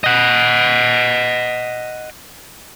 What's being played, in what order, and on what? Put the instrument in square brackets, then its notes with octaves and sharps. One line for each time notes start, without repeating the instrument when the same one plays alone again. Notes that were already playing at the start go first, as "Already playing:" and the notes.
[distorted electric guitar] D#5 F#5